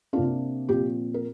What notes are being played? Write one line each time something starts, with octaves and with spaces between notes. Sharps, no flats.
C3 A#3 D4 F4
A#2 F3 C4 G4
A#4